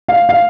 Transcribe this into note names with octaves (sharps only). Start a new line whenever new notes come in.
F5
F5